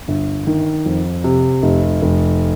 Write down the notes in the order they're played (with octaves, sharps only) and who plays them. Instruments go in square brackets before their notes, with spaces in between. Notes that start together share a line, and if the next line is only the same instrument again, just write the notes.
[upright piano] G1
D#3
F2
C3
F1
F1